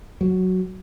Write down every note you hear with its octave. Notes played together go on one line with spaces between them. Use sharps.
F#3